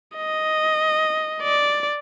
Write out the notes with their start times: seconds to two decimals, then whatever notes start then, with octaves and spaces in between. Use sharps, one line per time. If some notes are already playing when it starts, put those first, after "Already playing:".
0.17 D#5
1.43 D5